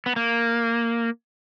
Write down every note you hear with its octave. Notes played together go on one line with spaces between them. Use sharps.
B3
A#3